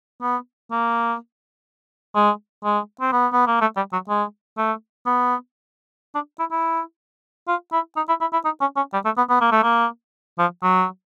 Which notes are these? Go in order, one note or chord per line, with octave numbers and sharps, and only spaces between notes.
B3
A#3
G#3
G#3
C4
B3
B3
A#3
A3
G3
F#3
G#3
A3
B3
D4
E4
E4
F4
E4
D#4
E4
E4
E4
D#4
C#4
C#4
G3
A3
B3
B3
A#3
A3
A#3
F3
F#3